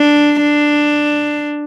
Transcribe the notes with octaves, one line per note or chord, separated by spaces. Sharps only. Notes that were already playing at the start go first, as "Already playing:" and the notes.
Already playing: D4
D4